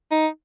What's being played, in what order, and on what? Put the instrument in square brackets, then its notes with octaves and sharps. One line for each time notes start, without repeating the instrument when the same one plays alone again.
[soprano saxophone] D#4